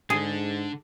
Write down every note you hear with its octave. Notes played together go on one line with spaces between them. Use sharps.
G#2 D3 D4 G#4